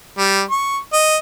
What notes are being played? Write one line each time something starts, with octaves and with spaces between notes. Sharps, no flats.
G3
C#6
D#5